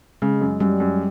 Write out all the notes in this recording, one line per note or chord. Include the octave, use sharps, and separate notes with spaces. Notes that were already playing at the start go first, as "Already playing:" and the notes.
C#3 G#3
F#2
F#2 G3
F#2